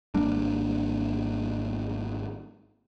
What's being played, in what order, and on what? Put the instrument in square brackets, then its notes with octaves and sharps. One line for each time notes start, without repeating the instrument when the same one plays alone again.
[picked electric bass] G#1 G3 A#3 D4